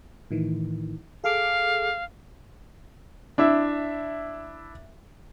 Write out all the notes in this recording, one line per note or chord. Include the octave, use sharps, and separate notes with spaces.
A2 D#3 E3
G#4 A4 F5 D6
D4 E4 E5